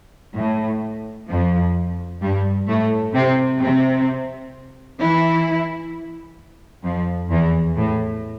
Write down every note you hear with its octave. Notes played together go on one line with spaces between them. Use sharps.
A2
F2 F3
G2 G3
A2 A3
C3 C4
C3 C4
E3 E4
F2 F3
E2 E3
A2